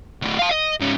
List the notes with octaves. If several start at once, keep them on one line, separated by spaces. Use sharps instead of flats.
F#3 A3
F5 A5
D#5
G#2 C#4